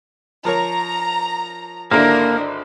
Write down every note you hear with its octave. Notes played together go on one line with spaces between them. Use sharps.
F3 A#4 C#5 A#5
G#1 D3 A#3 D4 E4 A#4